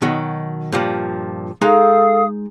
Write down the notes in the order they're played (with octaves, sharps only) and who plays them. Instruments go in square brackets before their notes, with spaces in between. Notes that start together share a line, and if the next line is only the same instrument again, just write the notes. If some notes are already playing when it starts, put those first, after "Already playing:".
[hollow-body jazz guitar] B2 D#3 F#3
G2 A#2 F3
[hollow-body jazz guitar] G#3 D#4 A#5 [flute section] A4 F5 D#6